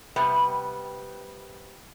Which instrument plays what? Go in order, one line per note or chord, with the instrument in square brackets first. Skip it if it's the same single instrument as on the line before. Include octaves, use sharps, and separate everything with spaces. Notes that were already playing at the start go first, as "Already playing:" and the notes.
[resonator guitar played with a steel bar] C3 G3 B3